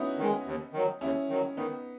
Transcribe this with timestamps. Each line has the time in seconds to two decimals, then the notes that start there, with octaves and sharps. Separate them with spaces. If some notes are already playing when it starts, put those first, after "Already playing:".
Already playing: B3 C#4 D#4 E4 F#4
0.18 D#3 G#3
0.46 D#2
0.73 D#3 F#3
1.01 D#2 C#4 E4
1.29 D#3 F#3
1.57 D#3 B3 D#4